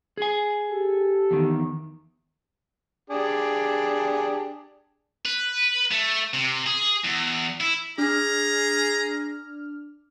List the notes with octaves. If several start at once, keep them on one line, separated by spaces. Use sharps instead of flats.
G#4 G#5
G4 A4
E2 D#3
D4 G4 G#4
B4
A3
C3
G#4
E2
E4
D4 G#4 A#5 F6